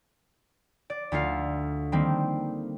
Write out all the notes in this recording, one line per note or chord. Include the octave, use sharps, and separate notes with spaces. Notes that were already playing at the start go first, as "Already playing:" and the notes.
D5
D2 A3 F4 F5
D#3 G3 A#3 C4